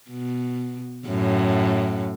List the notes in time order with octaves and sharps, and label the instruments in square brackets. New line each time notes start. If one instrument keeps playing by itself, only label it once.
[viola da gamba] B2
F#2 A2